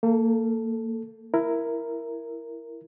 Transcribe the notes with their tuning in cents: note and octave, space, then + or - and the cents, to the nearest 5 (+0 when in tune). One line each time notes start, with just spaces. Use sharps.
A#3 -30 A4 +0
E4 +10 A#4 +0